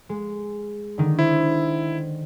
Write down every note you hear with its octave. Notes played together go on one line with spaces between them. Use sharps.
G#3
D3 D#3
E4 C5